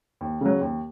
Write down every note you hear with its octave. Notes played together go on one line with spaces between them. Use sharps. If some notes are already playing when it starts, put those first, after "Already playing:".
D#2
C#3 F#3
D#2